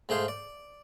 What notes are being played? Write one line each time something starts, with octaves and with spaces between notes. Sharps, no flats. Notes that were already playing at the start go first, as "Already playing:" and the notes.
G#2 A3 G#4 C5 F5
D5